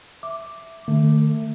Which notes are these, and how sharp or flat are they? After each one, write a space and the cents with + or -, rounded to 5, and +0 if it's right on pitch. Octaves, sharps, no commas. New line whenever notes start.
E5 +0 D6 +0
D#3 -45 A3 +10